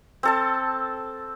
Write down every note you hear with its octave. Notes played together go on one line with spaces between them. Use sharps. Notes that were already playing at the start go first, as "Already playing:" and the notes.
C4 A4 A5